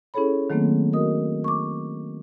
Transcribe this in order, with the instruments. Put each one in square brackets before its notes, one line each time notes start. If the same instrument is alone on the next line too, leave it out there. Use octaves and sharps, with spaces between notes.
[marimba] C#4 E4 G#4 A4 C#5 B5
D#3 F#3 A3 A#3 C4
F#4 A#4 D#5 D#6
C#6 D6